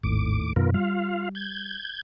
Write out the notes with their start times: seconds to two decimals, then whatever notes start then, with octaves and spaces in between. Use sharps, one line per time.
0.03 G#1 D#2 A2 D6
0.56 F#2 B2 D#3 B3 F4 A#4
0.74 G3 F4 F5
1.35 G6 G#6